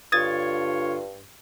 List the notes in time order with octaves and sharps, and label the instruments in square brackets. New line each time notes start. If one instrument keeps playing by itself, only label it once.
[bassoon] G2 [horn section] D3 F4 C#5 [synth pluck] D#6 G#6 A6